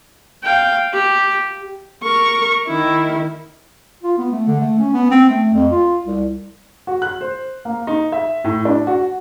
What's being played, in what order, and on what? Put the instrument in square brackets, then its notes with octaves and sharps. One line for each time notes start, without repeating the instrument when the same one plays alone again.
[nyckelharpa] F5 G5
G4
[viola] A#4 C#6
D#3 E4
[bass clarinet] F4
B3
A3
D3
A3
C#4
B3
C4
A3
F2
F4
C2
[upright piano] F#4
F#6
C5
A#3
D#4
E5
A2
D4
F#4